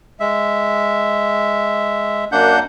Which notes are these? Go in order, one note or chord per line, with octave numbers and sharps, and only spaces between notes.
G#3 E5
F#2 A#3 D4 F#5 G6